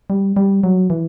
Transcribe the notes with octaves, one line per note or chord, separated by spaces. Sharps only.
G3
G3
F#3
E3